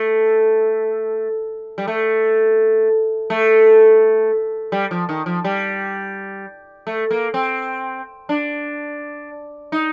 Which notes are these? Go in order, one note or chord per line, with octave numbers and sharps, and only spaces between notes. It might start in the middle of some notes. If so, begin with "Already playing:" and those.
Already playing: A3
G3
A3
A3
G3
F3
D#3
F3
G3
A3
A#3
C4
D4
D#4